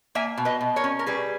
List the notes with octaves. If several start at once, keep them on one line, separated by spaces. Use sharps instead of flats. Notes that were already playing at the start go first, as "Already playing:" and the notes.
A#3 E5 G#5
B2
B4 D#5
B2
A#4 C#5
C#4
A#4
G3 G#4 B4